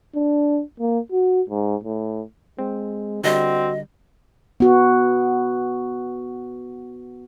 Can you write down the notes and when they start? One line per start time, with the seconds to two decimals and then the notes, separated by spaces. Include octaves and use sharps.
0.15 D4
0.80 A#3
1.12 F#4
1.50 G#2
1.84 A2
2.59 G#3 C4
3.24 D3 G3 C4 F#4 D#5
4.60 B3 F#4